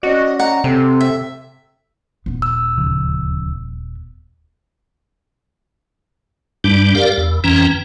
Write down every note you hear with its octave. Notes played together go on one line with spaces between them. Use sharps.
C#4 F#4 D5 D#5
F#5 A#5
C3 C4 A4
E5
D#1 B3
E6
D2 C#3 F3
G2 G3 D4
G4 A#4 D5 F5
E2
F2 E3 C#4 G5 A#5